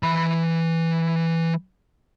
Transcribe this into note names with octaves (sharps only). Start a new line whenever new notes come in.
E3 B5